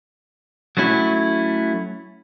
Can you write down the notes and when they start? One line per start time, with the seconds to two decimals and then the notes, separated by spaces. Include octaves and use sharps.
0.77 F#3 A3 C#4 E4